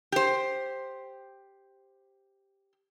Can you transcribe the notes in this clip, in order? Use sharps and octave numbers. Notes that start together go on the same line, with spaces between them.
G4 C5